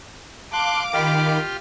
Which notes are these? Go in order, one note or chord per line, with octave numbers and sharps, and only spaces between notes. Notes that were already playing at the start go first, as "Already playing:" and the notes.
F5 A5 C6 D6 F#6
D#3 F4 G4 G5 B5 F6